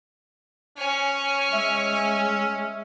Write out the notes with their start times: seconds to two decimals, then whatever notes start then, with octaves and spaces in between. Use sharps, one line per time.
0.78 C#4 C#5 G#5
1.52 G#3 E5